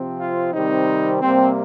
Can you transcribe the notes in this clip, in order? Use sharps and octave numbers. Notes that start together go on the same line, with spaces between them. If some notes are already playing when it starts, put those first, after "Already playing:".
Already playing: C3 F3 C4
F4
C3 D#3 G3 C4 D#4
C3 G3 A#3 C4